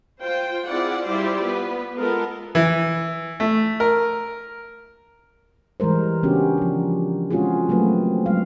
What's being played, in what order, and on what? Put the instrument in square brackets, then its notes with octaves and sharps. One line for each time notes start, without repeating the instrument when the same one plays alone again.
[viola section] F4 C5 G5
C4 E4 F4 G#4 D5 F#5
G3 E4 F4 G4 C5 D5
B3 B4
G#3 B3 F4 A4 A#4
[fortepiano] E3
A3
A#4
[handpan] E3 G3 G#3 A#4 C5
C#3 B3 C#4 D4 F#4 G4
F3 C#4
G#3 C4 C#4 F4 F#4 G#4
F#3 A3 A#3 C4 B4
F#3 G#3 F5